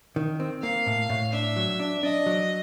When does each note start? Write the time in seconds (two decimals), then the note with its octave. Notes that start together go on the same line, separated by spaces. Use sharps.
0.16 D#3
0.40 C4
0.62 A#3 F5
0.87 A2
1.10 A2
1.33 D4 E5
1.56 F#3
1.80 D4
2.03 D4 D#5
2.26 F#3